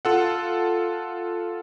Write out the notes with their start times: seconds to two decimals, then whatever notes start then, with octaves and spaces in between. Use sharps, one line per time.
0.05 F4 A4 F#5